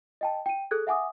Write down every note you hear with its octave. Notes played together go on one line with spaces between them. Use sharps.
D#5 G5 A5
G5 D#7
G#4 A4 F#6 G#6
E5 F#5 G#5 D6 D#6